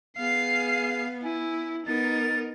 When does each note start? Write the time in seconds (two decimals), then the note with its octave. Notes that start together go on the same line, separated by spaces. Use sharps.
0.17 B3 G#4 F5 C7
1.23 E4 G#5
1.86 B3 D#4 A#4 A6